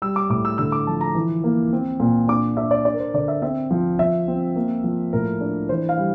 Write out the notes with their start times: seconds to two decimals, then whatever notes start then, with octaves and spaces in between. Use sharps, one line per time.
0.02 G3 E6
0.16 D6
0.30 A2 D6
0.45 E6
0.58 D3 E6
0.72 D6
0.87 F3 A5
1.01 A#5
1.15 E3
1.44 A#3
1.73 C4
2.00 A#2
2.28 D4 D6
2.57 D4 E5
2.71 D5
2.85 D4 D5
2.94 A#4
3.00 C5
3.14 D3 D5
3.28 E5
3.42 C4 E5
3.71 F3
3.99 F3 E5
4.28 C4
4.56 A#3
4.84 F3
5.13 A2 A#4
5.41 D4
5.69 E3 C5
5.89 F5
5.98 G3